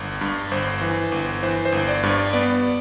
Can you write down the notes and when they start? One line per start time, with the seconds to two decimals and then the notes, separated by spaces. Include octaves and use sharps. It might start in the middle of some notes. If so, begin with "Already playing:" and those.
Already playing: G1
0.21 G2
0.51 G1 C5
0.81 E3
1.12 G1
1.43 E3 C5
1.65 C5
1.72 G1
1.88 D5
2.03 G2
2.10 D5
2.33 B3 D5